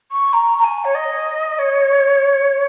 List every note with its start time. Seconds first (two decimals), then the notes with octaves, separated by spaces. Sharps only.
0.11 C#6
0.33 A#5
0.58 A#5
0.64 G#5
0.84 C#5
0.95 D#5
1.59 C#5